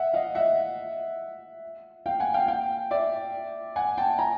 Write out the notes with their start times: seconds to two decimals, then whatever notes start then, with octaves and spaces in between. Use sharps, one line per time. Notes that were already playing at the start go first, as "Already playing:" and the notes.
Already playing: E5 F#5
0.14 D#5 F5
0.35 E5 F#5
2.06 F5 G5
2.20 F#5 G#5
2.34 F5 G5
2.48 F5 G5
2.91 D5 E5
3.76 F#5 G#5
3.97 G5 A5
4.19 G#5 A#5